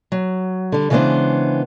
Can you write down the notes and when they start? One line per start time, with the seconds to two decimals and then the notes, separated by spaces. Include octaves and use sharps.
0.12 F#3
0.72 D3 G3
0.90 C#3 E3 G#3 B3 D4 C5